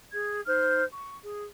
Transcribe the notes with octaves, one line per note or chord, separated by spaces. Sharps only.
G#4 G#6
D#4 C5 F6 G6
C#6
G#4